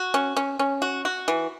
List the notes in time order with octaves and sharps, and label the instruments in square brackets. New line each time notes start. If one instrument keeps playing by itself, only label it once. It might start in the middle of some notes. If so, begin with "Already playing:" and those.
Already playing: [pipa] F#4
C#4
C#4
C#4
F#4
F#4
E3